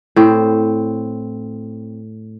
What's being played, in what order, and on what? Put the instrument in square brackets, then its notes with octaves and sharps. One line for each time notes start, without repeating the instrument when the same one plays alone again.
[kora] A2 C4